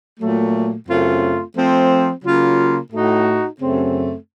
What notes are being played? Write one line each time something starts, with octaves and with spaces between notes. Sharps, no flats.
A#2 F#3 A3
F#2 C#3 A3 C4 F4
F3 A3 C4
C#3 F#3 A#3 F4
A2 A3 D#4 F#4
F#2 C#3 A3 C4